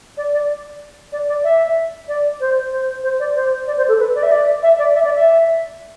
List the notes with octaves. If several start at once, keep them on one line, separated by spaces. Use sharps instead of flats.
D5
D5
D5
D5
E5
D5
C5
C5
C5
D5
C5
D5
C5
A4
B4
D5
E5
D5
E5
D5
E5
D5
E5